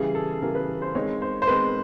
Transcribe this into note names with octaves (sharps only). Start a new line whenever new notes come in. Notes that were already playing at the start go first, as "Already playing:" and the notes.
Already playing: C#3 E3 G3 G#4
A4
C#3 E3 G3 A#4
B4
C5
D#3 G#3 C4 C#5
C5
C5
D#3 G#3 C4 B4